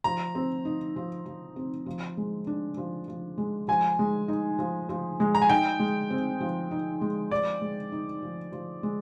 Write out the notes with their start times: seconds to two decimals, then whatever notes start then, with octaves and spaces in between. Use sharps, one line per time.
0.04 F3 A#5
0.35 C4
0.65 D#4
0.96 F3
1.26 F3
1.56 C4
1.86 F3
2.17 G#3
2.47 D4
2.77 F3
3.08 F3
3.38 G#3
3.68 F3 G#5
3.99 G#3
4.28 D#4
4.59 F3
4.89 F3
5.20 G#3
5.35 A#5
5.42 G#5
5.50 D#4 G5
5.79 G#3
6.10 C4
6.40 F3
6.71 D#4
7.01 G#3
7.31 F3 D5
7.61 G#3
7.92 D#4
8.22 F3
8.52 F3
8.83 G#3